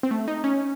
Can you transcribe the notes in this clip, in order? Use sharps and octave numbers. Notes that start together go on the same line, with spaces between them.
C4
A3
D#4
C#4